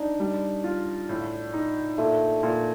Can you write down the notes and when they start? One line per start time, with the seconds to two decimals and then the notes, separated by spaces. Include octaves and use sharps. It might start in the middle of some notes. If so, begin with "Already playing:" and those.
Already playing: D4 D#4
0.20 G3
0.64 F4
1.09 A2
1.54 D#4
1.98 A#2 A3
2.43 A#2